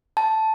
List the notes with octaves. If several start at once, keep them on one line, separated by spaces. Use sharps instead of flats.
A5